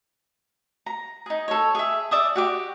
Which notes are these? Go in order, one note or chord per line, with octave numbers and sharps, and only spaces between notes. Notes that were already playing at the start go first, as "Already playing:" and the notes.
A#5
D#4 G#4
A4 C#5
G#4 E5
D5 E5 D#6
F#4 G4 D6